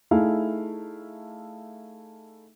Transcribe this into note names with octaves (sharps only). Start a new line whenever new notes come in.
A3 D#4 E4 G#4 F5